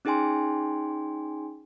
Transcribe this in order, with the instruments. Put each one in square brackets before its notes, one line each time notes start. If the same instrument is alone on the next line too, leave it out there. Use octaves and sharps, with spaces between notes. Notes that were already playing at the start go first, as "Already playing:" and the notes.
[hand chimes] C#4 D#4 G#4 G5 G#5 C6